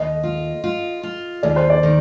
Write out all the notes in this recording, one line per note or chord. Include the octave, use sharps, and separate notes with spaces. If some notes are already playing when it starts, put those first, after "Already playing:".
Already playing: D#2 D#5
F4
F4
F4
D#2 D5
C5
D5
D#3